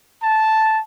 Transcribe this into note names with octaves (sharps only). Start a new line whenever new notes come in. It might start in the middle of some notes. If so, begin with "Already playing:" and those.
A5